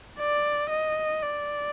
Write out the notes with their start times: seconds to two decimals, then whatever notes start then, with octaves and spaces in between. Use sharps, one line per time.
0.19 D5
0.70 D#5
1.22 D5